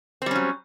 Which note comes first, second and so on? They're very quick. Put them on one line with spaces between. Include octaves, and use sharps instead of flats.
C4 G3 C#4 F#3